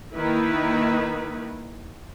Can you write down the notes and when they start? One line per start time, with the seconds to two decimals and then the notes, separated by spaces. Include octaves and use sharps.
0.15 D#3 A#3 D#4 E4 B4